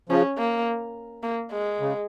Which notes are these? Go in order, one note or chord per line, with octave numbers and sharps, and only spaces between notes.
C#3 F3 C#4
A#3
A#3
G#3
C#3